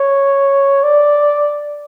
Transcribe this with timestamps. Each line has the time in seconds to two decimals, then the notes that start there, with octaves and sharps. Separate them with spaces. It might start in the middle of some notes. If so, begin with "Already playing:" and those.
Already playing: C#5
0.83 D5